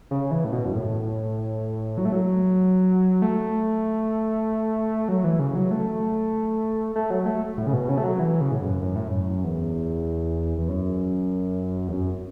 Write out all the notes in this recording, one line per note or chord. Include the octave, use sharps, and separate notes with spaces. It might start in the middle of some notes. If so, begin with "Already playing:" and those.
C#3
E3
A2
B2
F#2
A2
F#3
A3
F#3
A3
F#3
E3
C#3
F#3
A3
A3
F#3
A3
A2
C#3
B2
C#3
A3
F#3
E3
C#3
A2
F#2
F#2
A2
F#2
E2
E2
F#2
E2
F#2